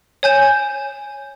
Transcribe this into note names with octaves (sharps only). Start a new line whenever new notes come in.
C#5 G#5 G6 E7